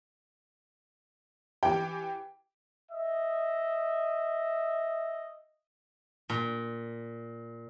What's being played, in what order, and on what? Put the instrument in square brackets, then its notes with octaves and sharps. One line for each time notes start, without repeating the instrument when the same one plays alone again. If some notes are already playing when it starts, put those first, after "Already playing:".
[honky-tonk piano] E3 G4 [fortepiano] G5
[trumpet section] D#5 E5
[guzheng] A#2